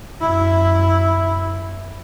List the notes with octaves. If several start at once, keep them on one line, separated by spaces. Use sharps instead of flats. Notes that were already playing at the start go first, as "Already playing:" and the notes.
F#2 E4